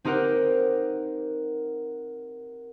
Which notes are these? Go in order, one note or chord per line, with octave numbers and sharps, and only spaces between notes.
C4 D#4 G4 A#4 F#5